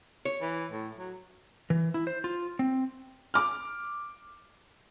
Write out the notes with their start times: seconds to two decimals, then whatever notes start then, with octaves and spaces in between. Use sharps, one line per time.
0.25 C#5
0.41 E3
0.71 A2
0.98 F#3
1.70 E3
1.94 E4
2.07 C5
2.24 F4
2.59 C4
3.34 D6 F6